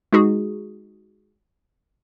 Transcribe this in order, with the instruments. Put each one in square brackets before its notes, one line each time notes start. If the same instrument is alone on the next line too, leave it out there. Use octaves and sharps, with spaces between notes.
[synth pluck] G#3 D#4 F#4 G#4